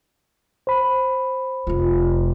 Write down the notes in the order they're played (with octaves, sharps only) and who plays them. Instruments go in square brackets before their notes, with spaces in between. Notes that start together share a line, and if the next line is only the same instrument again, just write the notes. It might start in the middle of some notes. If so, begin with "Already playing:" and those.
[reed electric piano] C5 B5
[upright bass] F1 F4